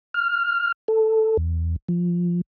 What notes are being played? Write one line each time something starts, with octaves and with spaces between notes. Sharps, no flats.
F6
A4
E2
F3